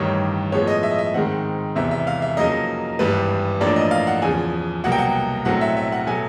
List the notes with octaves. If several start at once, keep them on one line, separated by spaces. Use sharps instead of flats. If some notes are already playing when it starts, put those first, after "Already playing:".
Already playing: A1 G2 D#3 G3 C#5
A2 F3 G#3 B3 C#5
D#5
E5
D#5
E5
G#2 D#3 G#3 C4 F#5
E1 E2 C3 E5
E5
F5
E5
F2 C#3 F#3 A#3 D#4 D#5
G#1 G2 E3 G3 B4
A1 A2 F3 A#3 D4 D5
D#5
F5
F#5
E2 C#3 F3 G#5
C2 B2 F#3 A#3 F#5
G5
F#5
B1 A2 F#3 A3 C4 F#5
E5
E5
F#5
B2 F#3 A3 G#5